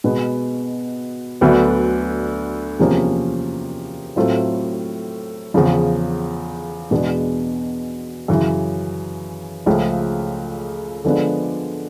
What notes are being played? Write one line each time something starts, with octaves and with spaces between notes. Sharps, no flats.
B2 G#3 B3
D2 D3 F#3 B3 D4
E2 C3 F3 A#3 C#4
A2 F#3 A3 C4 F4
E2 C#3 F3
E2 B2 G#3 B3 D4
F#2 C#3 E3
C#2 C#3 F3 A3
D3 F3 G#3 B3 D4